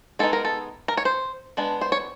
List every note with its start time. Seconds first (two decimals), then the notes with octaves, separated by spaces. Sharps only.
0.19 G#3 B3 D#4 A4
0.33 A#4
0.45 A4
0.88 A#4
0.97 C#5
1.05 C5
1.57 G#3 B3 D4
1.81 C5
1.92 C#5